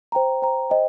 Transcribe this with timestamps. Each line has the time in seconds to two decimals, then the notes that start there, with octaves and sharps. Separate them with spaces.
0.12 C5 G5 A#5
0.42 C5 G5 A#5
0.70 C5 D#5 G5